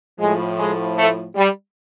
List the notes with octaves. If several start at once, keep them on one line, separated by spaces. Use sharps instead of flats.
A2 F3 G#3
G#3
A3
G3